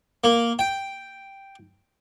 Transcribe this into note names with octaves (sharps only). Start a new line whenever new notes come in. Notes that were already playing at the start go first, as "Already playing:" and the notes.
A#3
G5